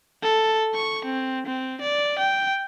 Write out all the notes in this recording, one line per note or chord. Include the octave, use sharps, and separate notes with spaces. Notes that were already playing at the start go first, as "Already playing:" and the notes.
A4
C#6
C4
C4
D5
G5